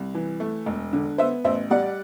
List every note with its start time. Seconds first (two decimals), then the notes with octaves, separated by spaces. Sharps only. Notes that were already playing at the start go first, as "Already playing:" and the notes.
Already playing: C2
0.15 E3
0.40 A3
0.66 E1
0.93 D3
1.18 B3 C5 E5
1.44 A1 C5 E5
1.70 G3 D5 F#5